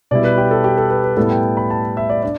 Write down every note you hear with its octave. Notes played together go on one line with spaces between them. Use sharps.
B2 G3 E4 D5
B4
G4
A4
G4
A4
B4
B4
A2 G3 B3 E4 A4
G5
B5
A5
E5
D5
D4 D5